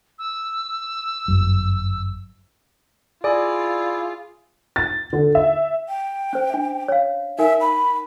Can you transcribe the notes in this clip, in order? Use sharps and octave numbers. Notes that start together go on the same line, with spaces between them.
E6
G1 F#2
E4 F4 G#4 D5 G#5
A6
D3
E5
G5
C#4 C5
D4 E5
C#5 F5
D#4 A#4 E5 G#5
B5